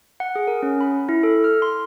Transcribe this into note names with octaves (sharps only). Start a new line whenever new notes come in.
F#5
G#4
A#4
C#4
B5
E4
A4
F6
C6